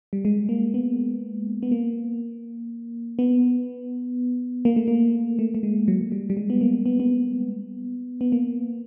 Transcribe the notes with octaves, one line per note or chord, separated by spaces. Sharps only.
G3
G#3
A#3
B3
B3
A#3
B3
A#3
A3
A#3
A3
A3
G#3
F#3
F#3
G3
G3
G#3
B3
A#3
B3
B3
B3
A#3